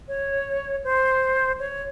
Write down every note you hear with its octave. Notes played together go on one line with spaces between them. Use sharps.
C#5
C5
C#5